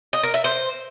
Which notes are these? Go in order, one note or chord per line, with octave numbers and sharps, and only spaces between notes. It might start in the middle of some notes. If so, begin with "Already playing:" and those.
D#5
A#4
E5
C5